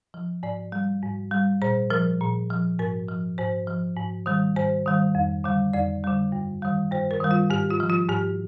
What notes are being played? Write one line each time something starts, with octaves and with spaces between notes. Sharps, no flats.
F3
G#2 D5
G3
G#2
G3
A#2 C5
F3 A#4
A#2
F3
G#2 A#4
F3
G#2 C5
F3
G#2
D#3 G3
G#2 C5
D#3 G3
F2
D3 G3
F2 D5
D3 G3
G2
D#3 G3
G2 C5
A#4
D#3 G3
F4
G#2 G4
F4
F3
F4
G#2 G4